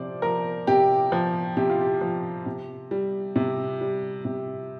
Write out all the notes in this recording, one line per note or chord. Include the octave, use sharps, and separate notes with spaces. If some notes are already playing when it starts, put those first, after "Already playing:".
Already playing: C3 F3 C5 D5
F3 A#4
C3 G4
F3
C3 G4
F4
G4
F3
C3
G3
C3
G3
C3